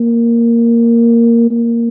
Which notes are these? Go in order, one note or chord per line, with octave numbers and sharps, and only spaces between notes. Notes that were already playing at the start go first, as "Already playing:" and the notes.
Already playing: A#3
A#3